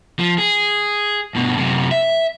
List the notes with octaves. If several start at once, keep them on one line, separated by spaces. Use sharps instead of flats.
F3
G#4
G2 B2
F#2 C3
E5